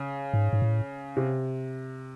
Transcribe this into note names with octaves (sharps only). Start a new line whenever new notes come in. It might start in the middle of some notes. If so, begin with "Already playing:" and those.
Already playing: C#3
G#2
G#2
A2
C3